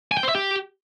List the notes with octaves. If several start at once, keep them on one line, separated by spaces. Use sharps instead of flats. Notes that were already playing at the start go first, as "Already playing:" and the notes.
G#5
G5
C5
E5
G4